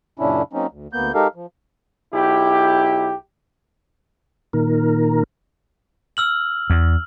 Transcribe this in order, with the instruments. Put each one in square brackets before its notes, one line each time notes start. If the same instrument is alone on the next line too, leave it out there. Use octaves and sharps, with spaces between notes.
[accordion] F#2 A#2 C#3 C#4 D4 E4
F#3 A#3 C4 C#4 D#4
D2
D2 A#3 B3 G6
G#3 D#4 G4 A4 A#4 F5
F3
[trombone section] B1 E4 G4
[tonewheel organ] A#2 D#3 A#4
[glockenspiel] E6 F6 F#7
[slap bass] E2